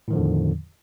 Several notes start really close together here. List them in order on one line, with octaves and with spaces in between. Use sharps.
A2 D#3 F3 D3 E2